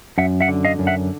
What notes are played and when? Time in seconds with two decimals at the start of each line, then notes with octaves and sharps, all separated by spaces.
0.18 F#2 E5 F#5
0.41 E5 F#5
0.48 D3
0.65 D#5 F5
0.79 F#2
0.87 E5 F#5